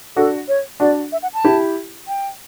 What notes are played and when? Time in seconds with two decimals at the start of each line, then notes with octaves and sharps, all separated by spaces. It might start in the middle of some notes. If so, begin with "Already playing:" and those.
0.16 D4 F#4 A4
0.48 C#5
0.80 D4 F#4 D5
1.12 E5
1.23 F#5
1.34 A5
1.45 E4 G4
2.08 G5